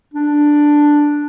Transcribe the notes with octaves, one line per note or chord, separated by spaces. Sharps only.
D4